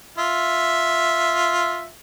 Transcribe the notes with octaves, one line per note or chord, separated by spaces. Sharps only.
F4 E5